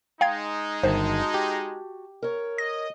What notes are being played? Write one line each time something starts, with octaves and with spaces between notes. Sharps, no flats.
G#3 D#4 F5 G5 G#6
G1 D#3 F#4 C5 A5
G4
A#4 C#5
D#5 A#6